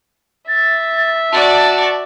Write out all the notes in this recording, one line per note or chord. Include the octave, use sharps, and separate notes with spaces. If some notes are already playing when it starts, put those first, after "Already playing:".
E5 A6
F#4 D5 A5